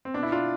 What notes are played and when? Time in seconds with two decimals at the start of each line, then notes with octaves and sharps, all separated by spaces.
0.05 C4
0.14 B2 D4
0.23 E4
0.32 B2 D4 F4